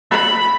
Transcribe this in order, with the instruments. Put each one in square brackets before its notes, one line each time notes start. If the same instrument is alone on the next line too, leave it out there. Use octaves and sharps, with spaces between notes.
[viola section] B5